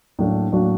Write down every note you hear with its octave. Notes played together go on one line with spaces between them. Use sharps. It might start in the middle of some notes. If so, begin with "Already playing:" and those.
A2 F#3 A#3 D4 F#4
A2 F#3 A#3 D4 F#4